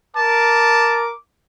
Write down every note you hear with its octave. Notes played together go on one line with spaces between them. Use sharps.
A#4 A5 D6